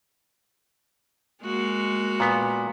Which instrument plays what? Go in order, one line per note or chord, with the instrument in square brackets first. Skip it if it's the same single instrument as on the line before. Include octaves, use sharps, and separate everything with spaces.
[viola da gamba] G#3 A#3 F#4
[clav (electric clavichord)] A#2 B3